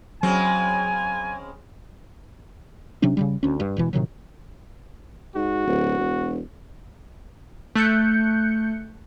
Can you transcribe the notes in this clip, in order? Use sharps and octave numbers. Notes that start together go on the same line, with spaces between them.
C#3 F#3 G#3 C4 G#5
C3 F#3 C#4 D4
C#3 E3 G3
D2 C#4
G2
E1 B2 E3
A2 C3 D#3 F#3
G#2 F#4
D1
E1
A3 F#6 G6 C#7